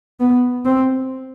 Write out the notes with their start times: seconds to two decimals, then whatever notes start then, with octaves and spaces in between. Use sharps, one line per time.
0.20 B3
0.65 C4